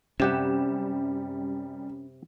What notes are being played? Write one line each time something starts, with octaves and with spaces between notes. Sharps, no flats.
F#2 C3 G3 C#4 G4 F#5 E7